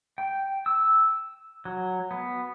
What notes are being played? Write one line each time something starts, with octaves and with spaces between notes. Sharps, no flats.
G5
E6
F#3
B3